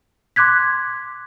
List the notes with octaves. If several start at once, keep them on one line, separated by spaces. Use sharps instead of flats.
C6 D6 F#6 G#6 B6